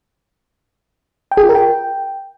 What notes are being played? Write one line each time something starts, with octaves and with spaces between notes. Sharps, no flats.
G5
G#4
F4
A#4
G5